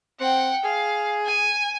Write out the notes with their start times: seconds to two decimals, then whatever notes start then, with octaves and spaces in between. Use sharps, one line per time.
0.20 C4 F#5 G5
0.65 G#4 F5
1.26 G#5